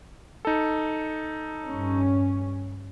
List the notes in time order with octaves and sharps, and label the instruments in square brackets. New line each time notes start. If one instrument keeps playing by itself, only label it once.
[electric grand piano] D#4 A4
[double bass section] G2 C#4